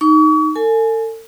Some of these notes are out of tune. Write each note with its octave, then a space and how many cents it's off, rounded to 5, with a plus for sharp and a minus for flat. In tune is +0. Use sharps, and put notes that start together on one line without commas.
D#4 +0 C#6 +40
A4 +40 G#5 +25